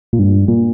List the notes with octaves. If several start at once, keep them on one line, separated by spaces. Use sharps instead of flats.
A#2
G2
A#2